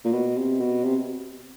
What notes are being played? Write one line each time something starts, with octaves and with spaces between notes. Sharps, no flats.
A#2
B2
C3
B2
C3